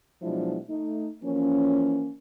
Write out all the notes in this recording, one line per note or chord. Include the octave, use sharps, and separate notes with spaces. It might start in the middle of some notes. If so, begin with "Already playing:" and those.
B2 F3 F#3 G#3 D4 E4
A3 D#4
E3 F3 A#3 C#4